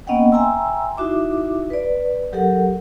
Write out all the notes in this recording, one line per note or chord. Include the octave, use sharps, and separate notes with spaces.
A#3 B3 C#4 D#5 F#5 G5
E5 G5 G#5 A#5 C6 E6
D#4 E4 F#4 E5 D6
B4 D5
F#3 G4 A4 A#4 F#5